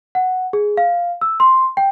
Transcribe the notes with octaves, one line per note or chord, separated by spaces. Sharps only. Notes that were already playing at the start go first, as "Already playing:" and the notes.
F#5
G#4
F5
E6
C6
G5